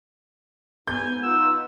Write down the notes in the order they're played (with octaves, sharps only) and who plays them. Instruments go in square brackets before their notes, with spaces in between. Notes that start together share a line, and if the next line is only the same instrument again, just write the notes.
[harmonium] G#2 [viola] B3 G#5 [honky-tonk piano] G6
[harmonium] D#4 F4 F#5 [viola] B4 [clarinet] E6